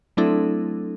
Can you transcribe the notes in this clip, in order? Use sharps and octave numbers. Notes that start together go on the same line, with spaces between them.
F#3 A3 C4 D4 E4 A4